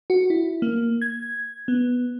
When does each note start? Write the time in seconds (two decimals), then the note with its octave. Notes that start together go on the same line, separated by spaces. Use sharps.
0.10 F#4
0.30 E4
0.62 A#3
1.02 G#6
1.68 B3